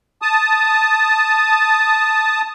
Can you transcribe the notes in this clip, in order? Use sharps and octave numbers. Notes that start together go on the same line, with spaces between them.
A5 D#6